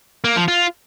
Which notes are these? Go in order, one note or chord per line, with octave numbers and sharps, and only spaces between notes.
A#3
F3
F4